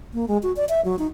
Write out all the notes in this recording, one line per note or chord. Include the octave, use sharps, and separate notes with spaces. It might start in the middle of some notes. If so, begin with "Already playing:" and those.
A#3
G#3
F#4
D5
E5
F#3
D#4